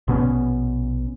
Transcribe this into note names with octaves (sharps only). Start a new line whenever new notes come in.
A#1 B2 B3 C#4